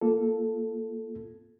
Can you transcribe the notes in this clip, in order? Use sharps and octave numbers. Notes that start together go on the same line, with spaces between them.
A#3 F4 A4